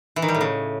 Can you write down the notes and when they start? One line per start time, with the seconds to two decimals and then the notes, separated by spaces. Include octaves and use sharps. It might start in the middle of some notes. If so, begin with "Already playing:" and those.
0.16 E3
0.22 D#3
0.28 G3
0.35 A2
0.41 C#3